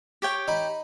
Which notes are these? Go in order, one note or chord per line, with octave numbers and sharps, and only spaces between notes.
G4 C#5 G5
D#4 B5